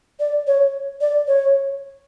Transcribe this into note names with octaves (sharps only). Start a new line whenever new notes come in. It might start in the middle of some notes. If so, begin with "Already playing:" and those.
D5
C#5
D5
C#5